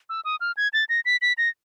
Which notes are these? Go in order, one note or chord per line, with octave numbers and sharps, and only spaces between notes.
E6
D#6
F6
G#6
A6
A#6
B6
B6
A#6